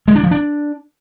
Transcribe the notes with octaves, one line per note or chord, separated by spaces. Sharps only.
G#3
D4
F3
D4